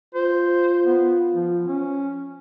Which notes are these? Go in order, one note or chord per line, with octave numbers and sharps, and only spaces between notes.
F4 C5
B3
F3
C#4